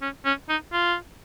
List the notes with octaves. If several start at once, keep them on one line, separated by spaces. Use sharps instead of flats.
C#4
C#4
D#4
F4